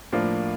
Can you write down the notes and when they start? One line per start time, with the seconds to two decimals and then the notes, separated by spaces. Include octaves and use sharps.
0.12 A2 F3 A#3 D4 F4